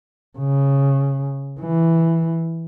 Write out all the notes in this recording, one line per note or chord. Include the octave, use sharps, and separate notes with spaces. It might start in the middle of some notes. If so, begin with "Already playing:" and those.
C#3
E3